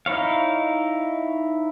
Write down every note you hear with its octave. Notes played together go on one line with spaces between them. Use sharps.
D#4 E4 C#5 F5